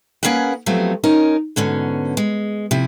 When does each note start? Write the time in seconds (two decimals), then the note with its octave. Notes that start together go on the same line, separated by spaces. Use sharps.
0.23 A#3 C#4 G#4 A#4 B4 F#5
0.66 F3 F#3 A3 B3 C4 G4
1.04 C#4 D#4 A#4
1.56 G#2 B2 D3 C#4
2.17 G#3
2.71 C3 F3 E4